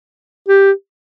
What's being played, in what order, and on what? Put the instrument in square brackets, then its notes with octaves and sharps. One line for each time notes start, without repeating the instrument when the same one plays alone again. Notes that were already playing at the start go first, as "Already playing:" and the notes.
[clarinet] G4